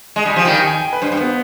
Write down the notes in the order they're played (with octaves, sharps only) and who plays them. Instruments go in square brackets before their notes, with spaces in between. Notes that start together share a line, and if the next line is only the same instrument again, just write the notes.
[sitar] G#3 [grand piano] D#5
[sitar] G3 [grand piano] G#5
[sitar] F3
[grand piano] G5
[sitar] D#3 G3
[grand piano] G5
G#5
G5
B4
[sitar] G2 [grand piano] C5
[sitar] G2
[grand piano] B3